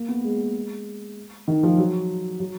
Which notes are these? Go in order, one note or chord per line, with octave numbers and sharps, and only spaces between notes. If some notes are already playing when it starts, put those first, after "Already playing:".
Already playing: A#3
B3
G#3
D#3
F3
F#3
F#3